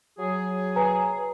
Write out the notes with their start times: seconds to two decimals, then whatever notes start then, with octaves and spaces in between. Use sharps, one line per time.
0.19 F#3 G#4
0.76 B4 G#5 A#5